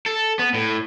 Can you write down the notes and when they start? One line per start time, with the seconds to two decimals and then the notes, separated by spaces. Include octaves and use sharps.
0.06 A4
0.39 B3
0.54 A2